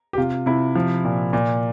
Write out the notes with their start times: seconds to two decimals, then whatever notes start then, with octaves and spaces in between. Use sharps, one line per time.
0.13 G4
0.18 C3 F4
0.46 C3 E4
0.76 F3
1.04 A#2
1.33 A#2